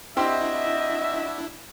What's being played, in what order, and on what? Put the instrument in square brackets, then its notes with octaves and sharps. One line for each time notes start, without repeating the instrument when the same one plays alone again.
[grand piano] C4 G4 C6 [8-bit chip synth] D4 E4 [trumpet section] F#4 E5 [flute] D#5